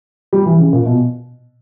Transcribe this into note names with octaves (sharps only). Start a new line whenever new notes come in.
G3
E3
C#3
A#2
B2